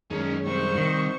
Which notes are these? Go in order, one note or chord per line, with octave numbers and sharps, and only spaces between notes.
F#2 D#3 G#3 C#4 D#4
C2 C3 C5 C#6
D#3